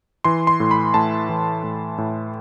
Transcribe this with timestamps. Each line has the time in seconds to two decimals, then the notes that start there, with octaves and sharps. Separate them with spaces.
0.24 E3 C6
0.47 C6
0.60 A2
0.71 B5
0.94 A2 A5
1.29 E3
1.63 A2
1.98 A2